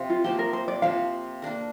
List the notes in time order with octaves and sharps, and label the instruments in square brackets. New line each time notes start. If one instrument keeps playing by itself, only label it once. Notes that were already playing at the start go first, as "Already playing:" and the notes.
Already playing: [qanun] C3 F3
[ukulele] F4
[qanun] C3 F3 A#3 [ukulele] G4
[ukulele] A#4
C5
D5
[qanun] C3 F3 A#3 [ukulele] F5
[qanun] A#3 D4 A#4